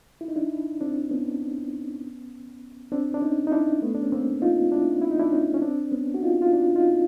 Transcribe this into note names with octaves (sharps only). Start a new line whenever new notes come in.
E4
D#4
D4 E4
C4 D4
B3 C#4
C4 D4
D4
C#4 D#4
D#4
D4 E4
A3 B3
D4
C#4
A#3 C4
D#4 F4
D4 E4
E4
D#4
D4 E4
C#4 D#4
C#4
C4 D4
B3 C#4
F#4
D#4 F4
F4
D4 E4
D#4 F4